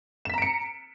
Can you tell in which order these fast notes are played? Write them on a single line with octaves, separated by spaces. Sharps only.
E7 B6 A#5 D7 C#7